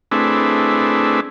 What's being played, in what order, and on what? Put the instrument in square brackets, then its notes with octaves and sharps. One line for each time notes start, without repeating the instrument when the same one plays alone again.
[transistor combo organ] A3 C4 D4 E4 G#4 B4